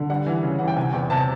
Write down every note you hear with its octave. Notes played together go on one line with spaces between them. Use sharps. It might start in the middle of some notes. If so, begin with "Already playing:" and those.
Already playing: D3
G3 F#5
E3
C#3
E3 F#5
G5
C3 G#5
E2 G5
C3 A5